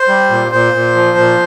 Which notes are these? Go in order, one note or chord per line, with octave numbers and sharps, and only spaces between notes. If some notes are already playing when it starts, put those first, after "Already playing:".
Already playing: C5
G3
A#2
A#2 C5
A#2
F3
A#2